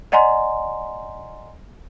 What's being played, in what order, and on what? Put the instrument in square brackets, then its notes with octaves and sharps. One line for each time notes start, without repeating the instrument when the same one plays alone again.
[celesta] D5 D#5 F#5 G#5 A#5 C6